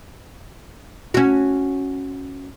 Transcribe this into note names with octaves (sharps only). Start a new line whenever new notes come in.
C#4 F#4